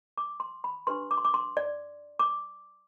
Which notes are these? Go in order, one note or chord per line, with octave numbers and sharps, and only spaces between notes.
D6
C6
B5
D4 G4 B4 C6
D6
C6
D6
C6
D5
D6